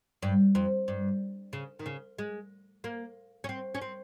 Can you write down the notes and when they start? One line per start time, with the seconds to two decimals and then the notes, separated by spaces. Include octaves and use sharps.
0.22 G2
0.55 F2
0.88 G2
1.53 C#3
1.79 D#3
1.86 C#3
2.18 G#3
2.84 A#3
3.44 C#4
3.49 C4
3.75 C#4
3.82 C4